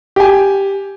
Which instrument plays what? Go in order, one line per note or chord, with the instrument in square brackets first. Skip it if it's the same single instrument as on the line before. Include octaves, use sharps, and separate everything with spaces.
[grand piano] G4 G#5